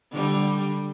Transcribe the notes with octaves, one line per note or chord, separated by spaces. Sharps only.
D3 G3